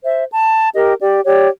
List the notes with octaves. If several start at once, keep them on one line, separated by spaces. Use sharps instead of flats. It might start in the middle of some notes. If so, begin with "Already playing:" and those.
C5 E5
A5
G4 A#4 D#5
G4 D5
G4 C#5 D5